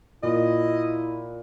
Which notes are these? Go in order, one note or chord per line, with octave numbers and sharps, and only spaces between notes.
A#2 E4 D#5